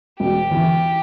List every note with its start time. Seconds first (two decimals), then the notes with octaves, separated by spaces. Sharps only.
0.19 E1 G4
0.50 E2 E3